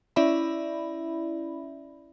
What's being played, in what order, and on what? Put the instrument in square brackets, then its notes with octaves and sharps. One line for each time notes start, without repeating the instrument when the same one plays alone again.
[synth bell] C#4 E4 D5 E5 B5